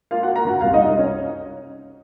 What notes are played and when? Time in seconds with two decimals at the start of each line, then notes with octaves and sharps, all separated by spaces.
0.11 A#3 F4 F5
0.23 F#4 F#5
0.28 A#3
0.36 A#4 A#5
0.45 C#3 F#4 F#5
0.61 C2 F4 F5
0.74 D#4 D#5
0.78 C2
0.86 D#4 D#5
0.99 C#4 C#5